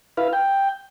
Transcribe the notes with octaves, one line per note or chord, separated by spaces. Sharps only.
E4 B4 F5
G5